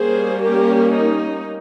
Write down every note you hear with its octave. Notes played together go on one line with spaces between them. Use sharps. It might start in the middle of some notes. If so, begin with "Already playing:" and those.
Already playing: G3 A#3 C#4 G#4 C5
G4 A#4
D#4